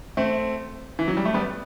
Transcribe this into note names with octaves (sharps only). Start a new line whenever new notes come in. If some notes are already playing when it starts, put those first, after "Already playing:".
A3 C4
E3
F#3
G3
A3
G3 B3